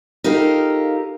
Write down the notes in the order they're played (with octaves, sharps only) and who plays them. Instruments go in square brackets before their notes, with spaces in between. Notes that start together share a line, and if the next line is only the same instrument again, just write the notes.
[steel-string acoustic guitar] D#4 F4 G4 A4 A#4 F5